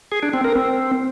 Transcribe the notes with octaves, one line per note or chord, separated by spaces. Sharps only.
G#4
D4
C4
A#4
C4